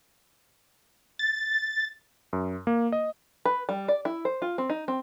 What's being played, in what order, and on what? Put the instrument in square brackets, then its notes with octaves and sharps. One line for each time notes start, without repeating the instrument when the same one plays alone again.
[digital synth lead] A6
[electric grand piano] F#2
A#3
D#5
[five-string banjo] B4
G3
D5
E4
C5
F4
C4
D#4
C4